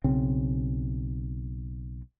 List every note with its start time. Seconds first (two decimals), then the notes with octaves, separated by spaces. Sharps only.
0.04 B1 C#3 C4